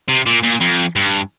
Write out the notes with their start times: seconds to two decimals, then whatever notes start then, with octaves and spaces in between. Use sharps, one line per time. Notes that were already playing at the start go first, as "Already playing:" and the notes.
0.09 C3
0.26 A#2
0.43 A#2
0.61 F2
0.96 G2